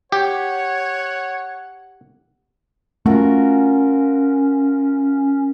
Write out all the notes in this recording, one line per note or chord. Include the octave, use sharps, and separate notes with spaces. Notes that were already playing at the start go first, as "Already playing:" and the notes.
G4 C#5 F#5
A3 C#4 F4 F#4 A#4